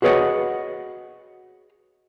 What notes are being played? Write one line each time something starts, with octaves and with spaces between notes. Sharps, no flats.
F#4 G#4 B4 C#5 D#5 F#5